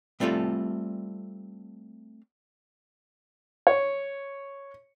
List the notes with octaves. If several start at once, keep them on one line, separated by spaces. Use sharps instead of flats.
G3 A3 C4 F4 A4
C#5